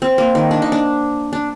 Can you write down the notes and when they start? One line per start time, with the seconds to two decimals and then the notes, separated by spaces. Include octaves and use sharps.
0.02 C4
0.18 A#3
0.35 D#3
0.51 D4
0.62 D#4
0.72 D4
1.33 D4